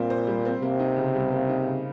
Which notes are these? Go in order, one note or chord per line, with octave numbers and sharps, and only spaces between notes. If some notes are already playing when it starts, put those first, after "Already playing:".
Already playing: A#2 G3 C4 F4
C5
G3
C4
C3 A#3
D#4
C#3
G3
A#3
D#4
C#3